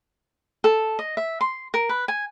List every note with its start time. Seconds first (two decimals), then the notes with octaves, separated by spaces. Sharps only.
0.64 A4
0.99 D#5
1.17 E5
1.41 C6
1.74 A#4
1.89 B4
2.08 G#5